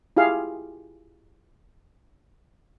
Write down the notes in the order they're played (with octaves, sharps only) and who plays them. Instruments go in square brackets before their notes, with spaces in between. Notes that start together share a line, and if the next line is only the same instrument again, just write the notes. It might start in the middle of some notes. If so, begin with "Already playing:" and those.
[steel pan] E4 F4 G4 G#4 F5